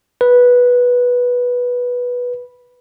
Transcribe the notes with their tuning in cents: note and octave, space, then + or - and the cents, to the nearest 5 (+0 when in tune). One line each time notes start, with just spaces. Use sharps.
B4 -10